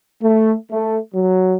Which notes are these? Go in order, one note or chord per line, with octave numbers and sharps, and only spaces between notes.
A3
A3
F#3